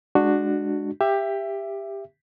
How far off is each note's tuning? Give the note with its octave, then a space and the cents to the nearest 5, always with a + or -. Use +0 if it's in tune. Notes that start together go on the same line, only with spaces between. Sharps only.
G#3 +0 D4 +15 F#4 +0
G4 +15 E5 +20